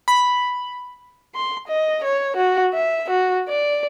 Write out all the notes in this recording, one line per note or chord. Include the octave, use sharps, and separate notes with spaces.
B5
C6
D#5
C#5
F#4
E5
F#4
D5